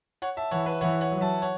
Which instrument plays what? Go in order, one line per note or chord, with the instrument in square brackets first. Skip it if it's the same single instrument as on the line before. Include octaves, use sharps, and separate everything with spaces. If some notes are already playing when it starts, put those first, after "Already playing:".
[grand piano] C#5 F#5
E5 A5
[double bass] E3 [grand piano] C#5 F#5
[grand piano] B4 E5
[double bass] E3 [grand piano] C#5 F#5
[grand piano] C#5 F#5
[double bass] F#3
[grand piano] E5 A5
C#5 F#5